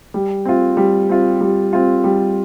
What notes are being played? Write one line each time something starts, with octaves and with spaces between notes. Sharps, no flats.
G3
C4 F4
G3
C4 F4
G3
C4 F4
G3